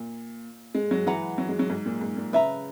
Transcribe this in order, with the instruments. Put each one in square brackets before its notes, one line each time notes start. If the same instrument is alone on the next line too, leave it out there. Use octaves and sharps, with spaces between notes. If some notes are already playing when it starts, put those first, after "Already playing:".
Already playing: [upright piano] A#2
G#3
F#3
[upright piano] E3 [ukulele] B4 F#5 A#5
[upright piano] F#3
G#3
F#3
G#2
A#2
G#2
A#2
[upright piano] C#3 [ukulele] B4 E5 A#5